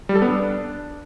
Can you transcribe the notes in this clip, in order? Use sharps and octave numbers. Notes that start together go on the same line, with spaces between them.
G3
A4
B3
D4